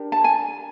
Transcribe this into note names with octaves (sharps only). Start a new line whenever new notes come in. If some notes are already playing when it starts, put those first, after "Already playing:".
Already playing: D4 G4 A#4
A5
G#5